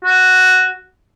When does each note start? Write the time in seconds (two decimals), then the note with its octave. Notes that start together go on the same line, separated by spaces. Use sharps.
0.04 F#4